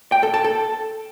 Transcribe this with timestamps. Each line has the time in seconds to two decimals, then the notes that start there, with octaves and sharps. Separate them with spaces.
0.12 G5
0.23 A4
0.34 A5
0.44 A4